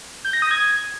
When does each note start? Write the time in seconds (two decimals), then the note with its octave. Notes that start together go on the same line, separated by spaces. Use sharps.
0.25 G6
0.33 A#6
0.42 D#6
0.51 G#6